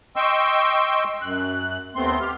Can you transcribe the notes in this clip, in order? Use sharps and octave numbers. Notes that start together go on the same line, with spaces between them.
D#5 G5 C6 C#6 E6
F#2 F#6
D#2 A3 B3 C4 C6
G4 F6